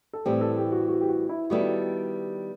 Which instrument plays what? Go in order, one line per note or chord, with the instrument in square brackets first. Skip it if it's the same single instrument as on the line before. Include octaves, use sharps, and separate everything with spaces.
[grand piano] A4
[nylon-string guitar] A2 E3 G3 C4 [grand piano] G4
[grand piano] A4
G4
F#4
F#4
G4
F#4
E4
[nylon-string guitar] D#3 G3 B3 E4 A4 [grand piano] F#4